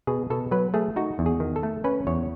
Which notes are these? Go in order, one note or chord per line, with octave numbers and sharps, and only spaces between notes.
B2 G#4
B2 A4
F#3 B4
A3 G#4
D#4 F#4
E2
G#4
D#3
A4
A3
C#4 B4
E2 C#5